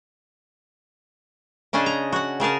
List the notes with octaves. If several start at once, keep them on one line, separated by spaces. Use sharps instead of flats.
C#3 C#4 D4 G#4 D#5 A5
A#5
F#4 F#5
C#3 G#4 A#4 A5